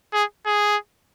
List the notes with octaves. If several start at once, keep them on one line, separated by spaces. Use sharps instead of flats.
G#4
G#4